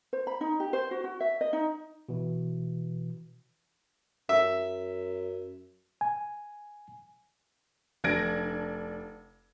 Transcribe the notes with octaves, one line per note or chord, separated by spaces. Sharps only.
C5
B5
D#4
G4
C5
F#4
F#4
E5
D#5
D#4
B2 E3
F#2 E5
G#5
F1 D4 G#6 A#6 D7